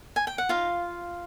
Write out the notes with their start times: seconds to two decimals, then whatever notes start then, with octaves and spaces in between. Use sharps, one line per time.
0.16 G#5
0.27 G5
0.38 F#5
0.49 D#4 F4 F5